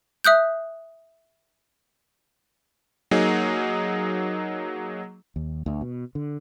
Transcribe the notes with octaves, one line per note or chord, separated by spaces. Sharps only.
E5 D#6 F#6 G6
F#3 A#3 D#4 G#4
D#2
D2
B2
D3